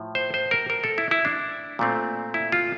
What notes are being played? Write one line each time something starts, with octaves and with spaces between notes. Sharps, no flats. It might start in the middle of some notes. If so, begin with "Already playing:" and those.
Already playing: A2 F3
C5
C5
A#4
A#4
A4
E4
E4
D4
A#2 A3 C4
E4
F4